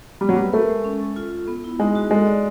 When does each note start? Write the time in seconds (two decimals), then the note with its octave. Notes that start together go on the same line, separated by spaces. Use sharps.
0.21 G3 B3
0.29 F#3
0.36 G3 B4
0.53 A3 A#4
0.69 G#3
0.84 C#4
1.00 A4
1.16 F4
1.32 F4
1.48 B3
1.64 E4
1.79 G#3 D#4
1.95 F#4
2.11 G#3 A4
2.27 D5